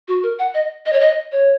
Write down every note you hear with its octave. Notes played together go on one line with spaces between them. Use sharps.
F#4
A#4
F#5
D#5
D#5
C#5
D#5
C#5